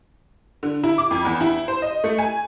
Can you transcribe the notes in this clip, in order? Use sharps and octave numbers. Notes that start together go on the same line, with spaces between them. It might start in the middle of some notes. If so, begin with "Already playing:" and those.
D3
E4
D6
F2
E2
E4
C5
D#5
A3
G#5